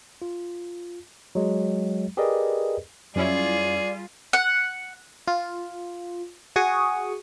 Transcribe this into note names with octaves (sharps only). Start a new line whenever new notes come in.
F4
F#3 G#3
G4 G#4 A#4 B4 D5 D#5
F#2 G3 C#4 E4 F4 G#4 D5
F#5
F4
F#4 G#4 C#6 D#6